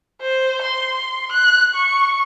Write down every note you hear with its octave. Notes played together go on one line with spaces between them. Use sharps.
C5
C6
F#6
C#6